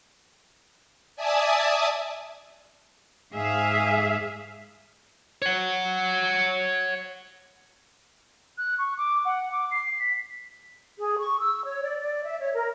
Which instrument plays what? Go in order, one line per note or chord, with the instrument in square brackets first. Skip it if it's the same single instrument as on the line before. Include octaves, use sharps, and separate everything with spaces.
[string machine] D5 E5 G#5 A5 D#6
[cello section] G#2 G#4 E5 F5
[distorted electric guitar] C#5 F#5
[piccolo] F#6
C#6
D6
F#5
D6
C7
B6
[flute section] G#4
C#6
E6
C#5
D5
D5
E5
C#5
A#4